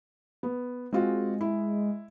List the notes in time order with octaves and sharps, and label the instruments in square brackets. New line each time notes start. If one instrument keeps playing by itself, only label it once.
[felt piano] B3
[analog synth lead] G#3 [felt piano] C4 F4 F#4
[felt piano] E4